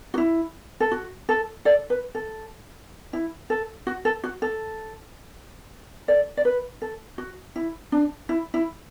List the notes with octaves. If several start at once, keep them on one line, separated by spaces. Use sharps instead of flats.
F#4
E4
A4
F#4
A4
A4 D5
B4
A4
E4
A4
F#4
A4
F#4
A4
A4 D5
D5
B4
A4
F#4
E4
D4
E4
E4